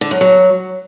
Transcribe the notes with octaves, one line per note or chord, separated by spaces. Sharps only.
D3
F#2
F#3